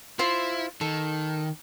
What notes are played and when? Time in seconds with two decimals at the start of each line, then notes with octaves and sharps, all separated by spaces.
0.19 E4 F4 C5 E5
0.81 D#3 A4